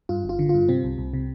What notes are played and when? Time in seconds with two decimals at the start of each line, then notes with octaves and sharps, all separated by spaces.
0.09 G2 F4
0.24 G1
0.29 F4
0.39 D3
0.49 G2 F4
0.68 C3 C4
0.84 C2
0.98 C2
1.13 C3